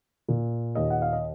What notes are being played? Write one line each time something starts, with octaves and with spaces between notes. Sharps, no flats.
A#2
D#2 D#5
F#5
F5
D#5